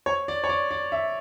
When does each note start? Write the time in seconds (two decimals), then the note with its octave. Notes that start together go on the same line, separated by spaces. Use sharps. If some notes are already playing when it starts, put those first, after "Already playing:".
0.06 C#5
0.28 D5
0.44 C#5
0.49 D5
0.71 D5
0.92 E5